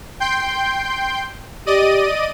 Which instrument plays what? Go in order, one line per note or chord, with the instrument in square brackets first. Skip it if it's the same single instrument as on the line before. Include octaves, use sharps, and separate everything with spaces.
[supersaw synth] G5 C6 G6
[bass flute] G4 [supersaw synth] D5 D#5 D#7